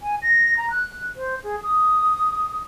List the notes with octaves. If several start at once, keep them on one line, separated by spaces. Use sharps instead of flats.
G#5
A#6
A#5
F#6
C5
G#4
D#6